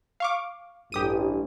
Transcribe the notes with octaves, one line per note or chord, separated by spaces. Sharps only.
F5 C#6 D6
A1 G2 G4 D#6 D#7